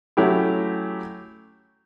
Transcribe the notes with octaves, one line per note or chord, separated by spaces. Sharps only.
F#3 A3 C#4 E4 G4